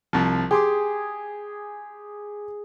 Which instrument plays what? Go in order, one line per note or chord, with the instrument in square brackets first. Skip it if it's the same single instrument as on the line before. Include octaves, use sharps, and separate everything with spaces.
[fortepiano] C2 F3
[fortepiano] G4 C6 D6 [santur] G#4